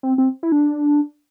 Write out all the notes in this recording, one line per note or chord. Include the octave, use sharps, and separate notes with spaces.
C4
C4
E4
D4